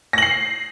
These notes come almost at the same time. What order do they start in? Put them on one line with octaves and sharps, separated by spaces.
A#6 F#7 C7